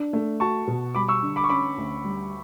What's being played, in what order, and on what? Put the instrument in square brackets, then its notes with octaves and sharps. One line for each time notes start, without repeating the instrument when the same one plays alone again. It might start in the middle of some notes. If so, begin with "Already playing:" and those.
Already playing: [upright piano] D4
A3
[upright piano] F#4 [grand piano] A5 C#6
[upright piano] B2
[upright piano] G3 [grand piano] B5 D6
[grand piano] C#6 E6
[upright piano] D3
[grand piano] B5 D6
C#6
[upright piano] C#4 [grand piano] B5 D6
[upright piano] D2
G3